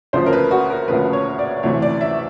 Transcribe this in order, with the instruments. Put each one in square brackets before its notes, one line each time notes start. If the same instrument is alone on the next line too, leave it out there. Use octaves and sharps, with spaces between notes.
[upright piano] D2 C#3 F3 C5
A#4
B4
F#4
A#4
D2 C#3 F3 B4
C#5
D5
D2 C3 E3 A3 C#5
D5
E5